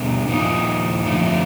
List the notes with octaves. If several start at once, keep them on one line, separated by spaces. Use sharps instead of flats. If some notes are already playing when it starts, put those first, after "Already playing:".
Already playing: B2 G3 B3 D4
A#2 F3 A#3 D#4
F2 D3 F3 A3